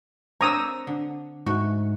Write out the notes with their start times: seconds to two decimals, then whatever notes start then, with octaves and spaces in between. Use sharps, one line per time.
0.41 C4 D4 C#5 A#5 D#6 E6
0.87 D3
1.46 G#2 A3 F#4